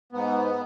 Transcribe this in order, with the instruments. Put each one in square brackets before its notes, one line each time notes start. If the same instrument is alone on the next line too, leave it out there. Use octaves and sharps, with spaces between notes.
[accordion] G#2 B3